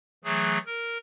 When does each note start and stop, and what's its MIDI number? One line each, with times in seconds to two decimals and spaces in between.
0.24 0.58 52
0.24 0.58 54
0.24 0.58 57
0.24 0.58 68
0.66 0.98 70